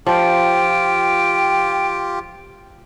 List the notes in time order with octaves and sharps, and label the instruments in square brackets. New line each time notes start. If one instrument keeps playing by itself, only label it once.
[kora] F3 [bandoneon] F4 G4 [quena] G5